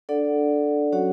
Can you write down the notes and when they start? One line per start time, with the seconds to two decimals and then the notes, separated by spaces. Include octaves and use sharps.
0.09 D4 A4 D5 F#5
0.92 F#3 C#4 F#4 C#5 F#5